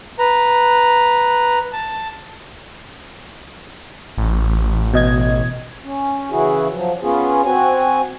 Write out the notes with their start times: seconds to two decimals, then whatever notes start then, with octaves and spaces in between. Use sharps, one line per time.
0.19 B4 A#5
1.73 A5
4.18 A1
4.94 B2 D#5 G#6
5.84 C#4
6.31 C#3 E3 E4 F#4 G#4
6.73 F3 F#3
7.02 B3 C#4 F4 G#4
7.45 C4 F#4 G#5